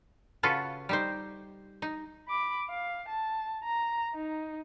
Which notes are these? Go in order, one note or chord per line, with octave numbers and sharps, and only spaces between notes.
C#3 F4 F#4 A4 B4
G3 D#4 C5
D#4
B5 D6
F5
A5
A#5
D#4